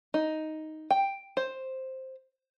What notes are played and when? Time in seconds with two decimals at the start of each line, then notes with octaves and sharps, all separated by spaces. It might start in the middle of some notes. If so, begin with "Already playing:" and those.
0.14 D#4
0.90 G5
1.37 C5